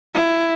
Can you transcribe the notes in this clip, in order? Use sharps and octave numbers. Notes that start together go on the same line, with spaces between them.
E4